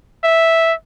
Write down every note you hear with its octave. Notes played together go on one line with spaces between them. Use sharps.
E5